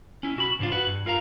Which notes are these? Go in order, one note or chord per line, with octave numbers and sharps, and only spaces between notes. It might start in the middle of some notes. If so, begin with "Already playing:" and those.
C#4 E4
B1 F#4 B5
C#2 G#2 A#3 D4 F4
F#4 B4
G2
F4 A#4 F5 A#5